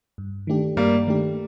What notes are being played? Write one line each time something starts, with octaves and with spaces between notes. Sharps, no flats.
G2
D#3 A3 D4 G4
G2 G3 A#3
D#3 A3 D4 G4